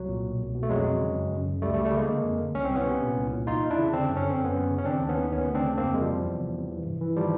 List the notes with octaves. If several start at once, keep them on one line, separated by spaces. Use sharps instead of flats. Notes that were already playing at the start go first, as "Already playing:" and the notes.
Already playing: C2 F#3
A#2
B2
C2
B2
A3
F2 F#3 G#3
F2
C#3
F#2
F#2
C#3
C#2 G3 A3
G3 A3
C#2
G3 A3
C#3 G#3 A#3
D3
F2
D3
C2 C#4
C4
C2
B3 C#4
C3
A#2
C2
A#2
E2 D#4 F4
E2
D4 E4
C#3
D3 C4 D4
F#2
C#4
D3
C4
F#2 B3 C#4
F#2
C#3
C#4
D#3 C4 D4
D#2
B3 C#4
D#3
D2 B3 C#4
D2
C4 D4
C#3
F2 A#3 C4
F2 G#3
F3 G3
C3
E2
E2
C3
E3
G2
E3
D#3 F3 G3